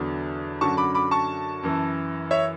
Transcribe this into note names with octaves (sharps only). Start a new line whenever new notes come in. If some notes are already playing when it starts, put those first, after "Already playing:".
Already playing: E2 D3 F#3
F#2 D3 F#3 A5 C#6
B5 D6
B5 D6
A5 C#6
F#2 E3
C#5 E5